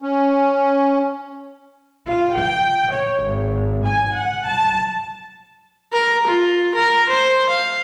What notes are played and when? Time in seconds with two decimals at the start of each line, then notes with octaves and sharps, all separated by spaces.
0.02 C#4
2.08 F4
2.37 G5
2.91 C#5
3.22 G#1
3.85 G#5
4.17 F#5
4.47 A5
5.93 A#4
6.28 F4
6.75 A#4
7.10 C5
7.50 F5